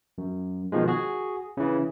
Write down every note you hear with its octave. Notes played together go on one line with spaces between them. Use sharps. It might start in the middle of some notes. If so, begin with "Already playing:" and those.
F#2
B2 D#3 F3 G#3
F#4 G#4
C#3 E3